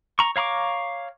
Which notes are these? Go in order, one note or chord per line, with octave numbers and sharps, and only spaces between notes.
A#5 C#6
C#5 F5 A#5 C#6 D6